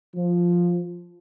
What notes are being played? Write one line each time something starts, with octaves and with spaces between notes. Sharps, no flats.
F3